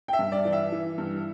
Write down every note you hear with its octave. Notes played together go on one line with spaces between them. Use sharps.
G5
E5
G2
D5
E3
E5
E3
G2